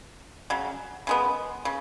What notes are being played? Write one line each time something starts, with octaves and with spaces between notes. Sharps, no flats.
C#3 F#3
C#3 G#3 B3
C#3